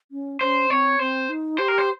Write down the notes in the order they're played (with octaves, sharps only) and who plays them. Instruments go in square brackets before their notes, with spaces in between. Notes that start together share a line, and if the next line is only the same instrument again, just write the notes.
[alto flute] C#4
[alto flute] C#4 [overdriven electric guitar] C5
[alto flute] C4 [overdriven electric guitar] C#5
[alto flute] C4 [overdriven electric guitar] C5
[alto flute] D#4
[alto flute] G4 [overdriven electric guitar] C5
[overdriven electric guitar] A#4
C5